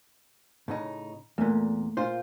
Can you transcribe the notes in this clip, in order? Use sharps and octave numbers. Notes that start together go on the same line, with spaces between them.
A2 C#3 D#4
E2 A#2 A3 A#3
A#2 F4 C5